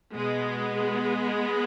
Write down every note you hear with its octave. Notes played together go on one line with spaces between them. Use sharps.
B2 G#3 B3